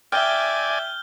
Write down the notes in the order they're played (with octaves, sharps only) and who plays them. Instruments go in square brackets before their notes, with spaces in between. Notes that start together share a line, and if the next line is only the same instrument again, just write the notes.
[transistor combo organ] D5 G#5 [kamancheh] E5 [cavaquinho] G5 [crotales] F6 G6 G7